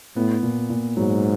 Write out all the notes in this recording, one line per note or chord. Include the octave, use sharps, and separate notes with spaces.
A2 B3
A#2
A#2
G#2 F#3